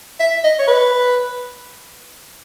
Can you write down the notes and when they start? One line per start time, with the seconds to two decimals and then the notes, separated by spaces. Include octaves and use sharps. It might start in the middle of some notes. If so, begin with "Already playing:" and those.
0.20 E5
0.44 D#5
0.59 C#5
0.67 B4